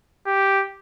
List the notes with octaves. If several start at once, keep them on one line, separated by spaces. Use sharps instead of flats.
G4